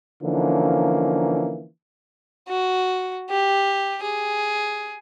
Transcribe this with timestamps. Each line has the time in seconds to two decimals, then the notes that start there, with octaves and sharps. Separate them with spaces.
0.23 D3 E3 F3 A#3 C#4 D#4
2.49 F#4
3.30 G4
4.03 G#4